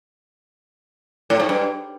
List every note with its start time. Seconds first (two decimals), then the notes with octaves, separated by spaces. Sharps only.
1.30 A2
1.40 G#2
1.49 G2